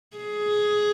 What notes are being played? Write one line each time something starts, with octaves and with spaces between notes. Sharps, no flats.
G#4